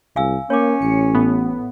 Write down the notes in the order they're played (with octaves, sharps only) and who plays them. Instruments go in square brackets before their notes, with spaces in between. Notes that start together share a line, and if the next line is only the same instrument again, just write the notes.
[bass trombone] C2 [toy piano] F5 G#5 E6
[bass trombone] A#3 [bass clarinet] C#4 [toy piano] C#5 D6
[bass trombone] A1 [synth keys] C#7
[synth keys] A2 B3